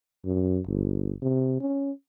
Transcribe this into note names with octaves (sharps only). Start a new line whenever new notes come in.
F#2
G1
C3
C#4